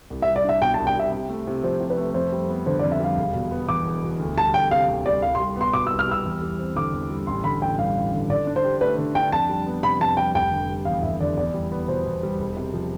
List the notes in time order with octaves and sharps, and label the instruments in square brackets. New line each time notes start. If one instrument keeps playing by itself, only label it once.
[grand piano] C2
[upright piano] E5
[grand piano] G3
[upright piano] D5
[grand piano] D4 [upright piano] E5
[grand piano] B2 [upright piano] G5
[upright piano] A5
[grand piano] C2
[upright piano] G5
[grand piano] G3 [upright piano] E5
[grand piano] C3
A3
C3
[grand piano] F3 [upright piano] C5
[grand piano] C3
[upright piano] B4
[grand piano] A3
[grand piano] F2 [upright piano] C5
[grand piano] G3
B3
[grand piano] D3 [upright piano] C5
[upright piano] D5
[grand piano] F2
[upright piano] E5
[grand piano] G3 [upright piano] F5
[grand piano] E1
B2
B3
[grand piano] E2 [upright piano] D6
[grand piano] E1
B2
D2
[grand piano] G3 [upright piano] A5
[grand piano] D2 [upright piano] G5
[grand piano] C3 [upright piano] F5
[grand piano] D2
[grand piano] G3 [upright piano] D5
[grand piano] C2 [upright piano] F5
[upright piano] C6
[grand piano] G3
[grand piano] B3 [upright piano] C6
[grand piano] B2 [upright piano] D6
[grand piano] C2 [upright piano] E6
[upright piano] F6
[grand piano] G3 [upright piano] E6
[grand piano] E2
G3
C4
[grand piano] D3 [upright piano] D6
[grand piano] E2
G3
[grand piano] A1 [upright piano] C6
[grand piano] D3 [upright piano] B5
[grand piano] A1 [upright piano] G5
[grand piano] G2 [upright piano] F5
[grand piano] A1
D3
[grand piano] D3 [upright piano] D5
[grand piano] D4
[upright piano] C5
[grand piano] G4
[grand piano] A3 [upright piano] B4
[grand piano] D3
[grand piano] D4 [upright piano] G5
[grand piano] F2 [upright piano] A5
[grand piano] G3
B3
[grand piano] C3 [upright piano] B5
[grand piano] F2 [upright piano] A5
[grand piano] G3 [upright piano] G5
[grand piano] F1 [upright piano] G5
[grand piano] D3
G3
[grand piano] E2 [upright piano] F5
[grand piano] F1 [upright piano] E5
[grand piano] D3 [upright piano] D5
[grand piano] E2 [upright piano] D5
[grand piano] G3
B3
[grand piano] B2 [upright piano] C5
[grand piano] E2
G3
E1
C3
F3